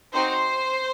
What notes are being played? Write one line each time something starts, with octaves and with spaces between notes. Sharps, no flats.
C4 D#4 F#4 C5